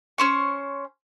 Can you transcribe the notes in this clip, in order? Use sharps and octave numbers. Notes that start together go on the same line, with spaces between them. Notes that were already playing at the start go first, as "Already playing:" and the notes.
C#4 C5 C#6